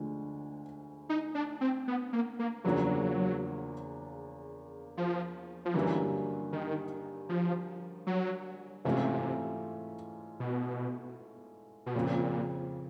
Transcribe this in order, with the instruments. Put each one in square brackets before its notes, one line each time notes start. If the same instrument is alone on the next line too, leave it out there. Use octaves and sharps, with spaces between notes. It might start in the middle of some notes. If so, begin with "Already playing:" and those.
Already playing: [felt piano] D2 D3 F3 G#3
[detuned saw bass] D#4
D4
C4
B3
A#3
A#3
[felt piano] E2 C#3 F3 A#3 D4 [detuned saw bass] F#3
[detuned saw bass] F3
F3
[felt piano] G2 D3 F#3 A#3 C#4 [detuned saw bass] E3
[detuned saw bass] D#3
F3
F#3
[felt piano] G#2 E3 A3 C#4 F4 [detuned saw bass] C3
[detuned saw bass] B2
B2
[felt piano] F2 C#3 F3 [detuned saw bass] A#2